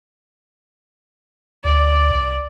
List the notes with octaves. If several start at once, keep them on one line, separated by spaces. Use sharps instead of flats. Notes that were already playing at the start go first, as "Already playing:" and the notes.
D2 D5
C2